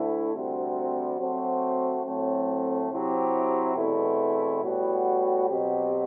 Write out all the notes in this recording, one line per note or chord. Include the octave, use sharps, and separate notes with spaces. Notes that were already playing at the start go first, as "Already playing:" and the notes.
Already playing: D2 D3 A3 E4
D2 C3 G3 C4 F#4
F#3 A3 C4 F#4 C5
A2 F#3 A3 C4
C3 F#3 C4 E4 G4
E2 B2 A3 C4 E4
A2 G3 B3 F#4
B2 F#3 C4 G4